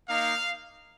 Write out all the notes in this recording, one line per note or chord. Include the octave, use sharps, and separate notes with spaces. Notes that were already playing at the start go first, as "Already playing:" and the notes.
A#3 D#4 F5